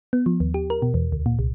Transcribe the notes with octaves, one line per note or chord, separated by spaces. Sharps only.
B3
F3
D#2
G4
A#4
B2
E2
D2
A#2
C2